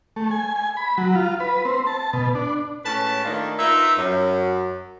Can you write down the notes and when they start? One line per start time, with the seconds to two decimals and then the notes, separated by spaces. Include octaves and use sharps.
0.16 A3
0.31 G#5
0.56 G#5
0.77 B5
0.98 F#3
1.15 F4
1.40 B4
1.65 C4
1.87 A5
2.13 B2
2.35 D4
2.85 A2 G#3 C#4 B4 A5
3.25 D#3 A3 A#3 D4 D#4 F4
3.59 D#4 F4 A#4 B4 E5
3.98 F#2